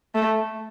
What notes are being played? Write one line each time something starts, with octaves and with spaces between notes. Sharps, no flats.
A3